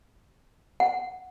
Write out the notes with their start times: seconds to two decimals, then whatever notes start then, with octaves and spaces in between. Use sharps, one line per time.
0.80 F#5